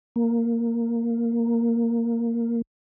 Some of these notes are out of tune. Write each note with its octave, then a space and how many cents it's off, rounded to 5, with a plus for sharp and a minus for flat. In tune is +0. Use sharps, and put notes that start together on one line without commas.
A#3 -5